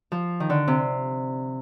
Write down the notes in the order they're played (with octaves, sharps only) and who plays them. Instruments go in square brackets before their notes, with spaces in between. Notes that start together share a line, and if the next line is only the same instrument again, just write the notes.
[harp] F3
D#3
D3
C3